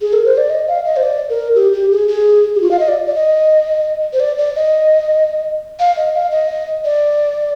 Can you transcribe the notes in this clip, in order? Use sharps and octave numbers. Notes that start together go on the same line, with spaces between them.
G#4
A#4
C5
D5
D#5
F5
D#5
C5
D5
A#4
G4
G4
G#4
G#4
G4
F4
F5
D#5
D5
D5
D#5
C5
D5
D5
D#5
F5
D#5
F5
D#5
D5